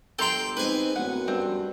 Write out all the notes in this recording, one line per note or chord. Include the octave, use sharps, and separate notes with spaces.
G1 G4 A4 G5 A#5 C6
G#3 C4 D#4 B4 G#5
D1 F#2 B3 F#5
G2 C4